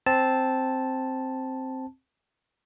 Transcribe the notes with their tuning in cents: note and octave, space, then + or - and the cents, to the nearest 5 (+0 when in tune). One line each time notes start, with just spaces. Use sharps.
C4 +0 A5 -5